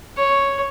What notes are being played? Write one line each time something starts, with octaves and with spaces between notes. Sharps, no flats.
C#5